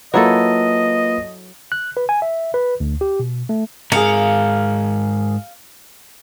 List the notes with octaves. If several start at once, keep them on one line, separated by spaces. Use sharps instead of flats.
F#3 A#3 E4 F4 A4 B4 D#5
F#6
B4
G#5
E5
B4
D2
G4
B2
A3
G#2 G#4 A#4 F5 C#7